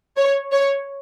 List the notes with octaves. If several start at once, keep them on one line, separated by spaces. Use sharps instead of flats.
C#5
C#5